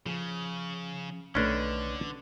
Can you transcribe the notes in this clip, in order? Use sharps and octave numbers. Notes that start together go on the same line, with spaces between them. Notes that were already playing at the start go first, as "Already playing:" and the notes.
C#3 F3 G#4
B1 D3 D#3 A3 C#4 D4 B4